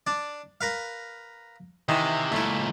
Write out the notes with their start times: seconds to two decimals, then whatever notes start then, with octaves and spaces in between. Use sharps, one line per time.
0.07 D4 D5
0.61 A#4 B4 F5
1.89 C3 D#3 E3
2.32 C#2 A#2 A3 E4